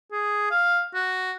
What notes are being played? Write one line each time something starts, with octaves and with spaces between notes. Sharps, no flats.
G#4
F5
F#4